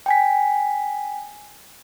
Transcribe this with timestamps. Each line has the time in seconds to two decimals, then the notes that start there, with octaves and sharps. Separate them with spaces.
0.06 G5 G#5 B6